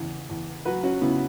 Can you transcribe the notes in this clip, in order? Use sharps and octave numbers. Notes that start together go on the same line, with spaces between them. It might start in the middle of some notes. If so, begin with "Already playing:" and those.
Already playing: E2 C#3
E2
F#3 F#4 B4
C#4 F#4
C#3 B3 E4